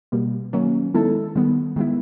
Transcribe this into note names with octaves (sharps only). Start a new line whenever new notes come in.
B2 G3 A#3
D#3 F#3 A#3 C#4
D#3 G#3 B3 E4 A4
D#3 G3 B3
D#3 G#3 B3 E4